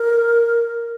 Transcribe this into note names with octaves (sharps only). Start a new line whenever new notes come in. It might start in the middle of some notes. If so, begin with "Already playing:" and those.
Already playing: A#4